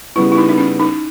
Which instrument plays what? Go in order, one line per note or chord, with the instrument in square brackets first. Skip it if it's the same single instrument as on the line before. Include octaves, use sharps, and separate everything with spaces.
[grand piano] C#3 G3 B3 [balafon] E4
[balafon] E4
D#4
D#4
C#4
D#4